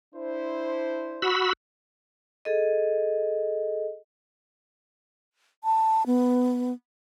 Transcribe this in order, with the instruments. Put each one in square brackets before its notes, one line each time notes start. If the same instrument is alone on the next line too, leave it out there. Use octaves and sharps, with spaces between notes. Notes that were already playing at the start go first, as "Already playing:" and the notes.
[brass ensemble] D4 E4 C5
[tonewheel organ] F#4 B5 E6
[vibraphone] G#4 A4 D#5
[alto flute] A5
B3